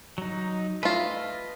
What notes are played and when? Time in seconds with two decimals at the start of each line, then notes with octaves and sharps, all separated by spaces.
0.18 F#3 D#4
0.83 A3 F4 B4 D#5